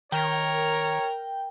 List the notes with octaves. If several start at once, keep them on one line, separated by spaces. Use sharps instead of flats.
D#3 A#4 C#5 G5